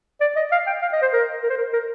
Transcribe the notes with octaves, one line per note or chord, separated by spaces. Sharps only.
D5
D#5
F5
G5
F5
D#5
C5
A#4
A#4
C5
A#4
A#4